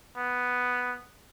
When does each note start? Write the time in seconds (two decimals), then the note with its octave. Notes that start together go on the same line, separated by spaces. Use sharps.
0.17 B3